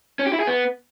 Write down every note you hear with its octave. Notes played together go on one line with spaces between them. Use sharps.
C#4
G4
E4
G#4
B3